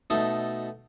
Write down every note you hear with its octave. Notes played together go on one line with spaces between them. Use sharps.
B2 A3 D#4 A4 D#5